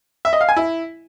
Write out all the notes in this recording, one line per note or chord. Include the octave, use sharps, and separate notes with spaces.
E5
D#5
F5
G#5
E4